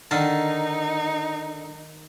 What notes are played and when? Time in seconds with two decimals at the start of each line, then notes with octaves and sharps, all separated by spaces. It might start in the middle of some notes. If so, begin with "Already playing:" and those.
0.11 D3 D#3 D#4 F5 A5